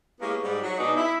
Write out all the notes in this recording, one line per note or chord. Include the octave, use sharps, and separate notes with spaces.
G#3 A#3 B3 C#4 E4 G4
G#2 G3
F#3
B2 G#3 B3 D4 D#4
E4